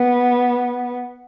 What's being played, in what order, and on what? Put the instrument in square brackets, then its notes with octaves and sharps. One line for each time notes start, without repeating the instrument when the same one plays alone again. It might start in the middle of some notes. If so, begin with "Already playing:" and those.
Already playing: [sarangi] B3